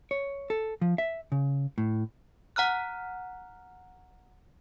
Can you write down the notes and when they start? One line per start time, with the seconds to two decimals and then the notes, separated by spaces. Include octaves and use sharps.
0.11 C#5
0.50 A4
0.82 F3
0.98 E5
1.32 C#3
1.78 A2
2.56 F#5 A#5 F6 F#6